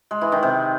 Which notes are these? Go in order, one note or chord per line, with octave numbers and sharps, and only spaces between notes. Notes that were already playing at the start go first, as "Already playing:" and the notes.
G#3
E3
D#3
C3